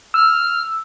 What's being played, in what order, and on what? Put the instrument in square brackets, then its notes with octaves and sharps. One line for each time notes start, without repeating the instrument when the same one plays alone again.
[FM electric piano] E6 [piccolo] F6